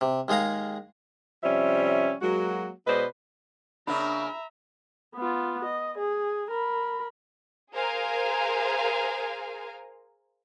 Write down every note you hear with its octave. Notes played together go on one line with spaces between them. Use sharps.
C3
D#2 G#3 G#4 F5 A#5
C3 F3 G3 C#4 E5
F#3 G#3 A#3 F#4
B2 G#3 B4 C5 D5 D#5
C#3 A#3 D4 E5 A#5 B5
B3 F4
D#5
G#4
A#4 B5
G#4 A#4 C5 F5 G#5 A#5